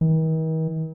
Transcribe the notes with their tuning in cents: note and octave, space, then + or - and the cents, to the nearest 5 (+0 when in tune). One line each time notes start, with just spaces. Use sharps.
D#3 +45